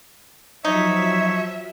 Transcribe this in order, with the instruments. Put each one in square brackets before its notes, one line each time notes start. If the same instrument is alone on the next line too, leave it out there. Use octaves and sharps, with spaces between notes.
[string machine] F3 F#3 [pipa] D#4 [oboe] C#5 [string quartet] E5